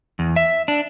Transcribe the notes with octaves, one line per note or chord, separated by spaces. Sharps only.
E2
E5
D4